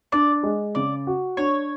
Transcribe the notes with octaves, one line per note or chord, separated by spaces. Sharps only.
D4 D5
G#3
C#3 D5
F#4
D4 C#5